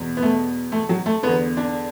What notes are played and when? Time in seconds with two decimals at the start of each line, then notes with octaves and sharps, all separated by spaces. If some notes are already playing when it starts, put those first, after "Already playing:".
Already playing: E2 B2
0.17 B3
0.23 A3
0.72 A3
0.89 F#3
1.06 A3
1.23 E2 D3 B3
1.57 D4